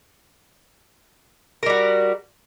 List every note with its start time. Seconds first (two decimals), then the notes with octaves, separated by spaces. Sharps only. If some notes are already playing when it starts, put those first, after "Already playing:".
1.63 A#4
1.66 G3
1.70 F#4